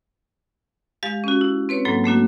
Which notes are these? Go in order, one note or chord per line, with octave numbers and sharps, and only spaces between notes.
G#3 G4 F5 A6
C#4 F#4
E4
C4 B4 C#5
G#2 F#3 A#3 A4
A3 A#3 D4 F#4